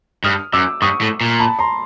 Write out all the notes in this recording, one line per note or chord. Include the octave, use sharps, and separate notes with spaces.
G2 D#6 F6
F#2 D6 E6
G2 C#6 D#6
A2
A#2
A5 B5
A#5 C6